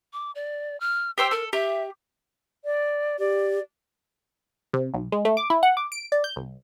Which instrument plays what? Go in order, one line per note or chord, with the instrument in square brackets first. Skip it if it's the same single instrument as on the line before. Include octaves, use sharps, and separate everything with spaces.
[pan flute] D6
D5
F6
[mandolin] G4 C5 E6 [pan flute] G5
[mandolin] A4 [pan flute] A#4
[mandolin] G4 [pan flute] E5
[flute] D5
[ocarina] G4 [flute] D5
[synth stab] C3
B1
G#3
A3
D6
E4
F#5
D6
D7
D5
G6
C2